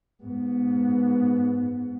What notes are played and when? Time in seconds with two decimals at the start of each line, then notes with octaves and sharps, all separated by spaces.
0.24 G#2 B3